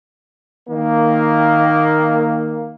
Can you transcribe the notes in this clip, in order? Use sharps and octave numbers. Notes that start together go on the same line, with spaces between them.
D#3 A#3